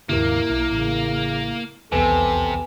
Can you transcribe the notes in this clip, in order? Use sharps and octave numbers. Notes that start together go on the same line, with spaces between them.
D#2 G#2 C#3 A#3 E4 G4 A#4
B1 E4
A1 C#3
D#1 B1 E2 C3 B3 A4 B4 G#5